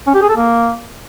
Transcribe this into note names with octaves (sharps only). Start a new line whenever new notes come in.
C#4
G4
G#4
A4
A#3